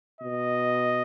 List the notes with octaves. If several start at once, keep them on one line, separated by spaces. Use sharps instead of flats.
B2 D#5